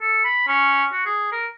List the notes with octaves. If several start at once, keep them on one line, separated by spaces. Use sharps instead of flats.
A4
B5
C#4
F#4
G#4
A#4